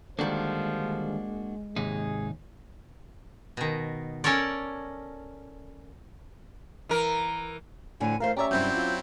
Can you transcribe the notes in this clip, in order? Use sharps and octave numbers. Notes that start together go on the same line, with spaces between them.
D3 D#3 F3 G3 G#3 A#3 D4 F#4
D#2 G#2 C3 D#4 G#4
B2 D#3
C#4 A4 A#4 C#5 D5
E3 A#4
F2 A2 D3 G#5
E3 A3 A#4 C5 F5
C#4 G4 C#5 D5 E5 A#5
G2 C3 F#3 G3 C4 E4 G6
F4